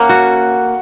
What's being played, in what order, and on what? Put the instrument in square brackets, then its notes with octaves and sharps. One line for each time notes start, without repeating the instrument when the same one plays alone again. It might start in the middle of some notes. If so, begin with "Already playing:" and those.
Already playing: [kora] A#3 C#4 [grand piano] F#5
[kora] F#4